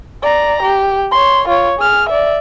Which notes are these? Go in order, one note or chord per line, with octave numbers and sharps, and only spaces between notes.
D5 A#5
G4
C#5 C6
F4 C#5
G#4 F6
D5 E5